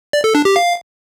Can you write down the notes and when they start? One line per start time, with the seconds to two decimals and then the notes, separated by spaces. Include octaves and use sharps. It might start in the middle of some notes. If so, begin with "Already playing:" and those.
0.13 D5
0.24 A4
0.35 D4
0.45 G4
0.56 F5